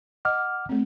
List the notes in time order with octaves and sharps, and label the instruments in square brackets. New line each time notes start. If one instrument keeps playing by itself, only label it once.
[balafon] D#5 [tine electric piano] F#5 D6 F6
[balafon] A3 C4